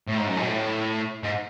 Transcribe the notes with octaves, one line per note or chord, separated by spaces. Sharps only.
A2
G#2
F#2
G#2
B2
A2
G#2